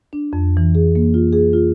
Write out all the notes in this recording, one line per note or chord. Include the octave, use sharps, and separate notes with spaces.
D4
F2
E3
G#4
A#3
F4
G#4
F4